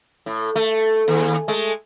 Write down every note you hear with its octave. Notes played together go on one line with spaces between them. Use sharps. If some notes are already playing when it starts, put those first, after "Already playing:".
A2
A3
D#2
G#3 A3